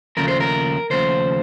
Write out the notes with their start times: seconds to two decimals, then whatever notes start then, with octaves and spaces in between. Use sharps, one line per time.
0.17 D#2 C#3 F3 A3 A#4
0.28 C5
0.40 A#4
0.90 D#2 C#3 F3 A3 C5